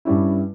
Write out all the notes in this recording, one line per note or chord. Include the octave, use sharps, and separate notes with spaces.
G2 G3 C#4 E4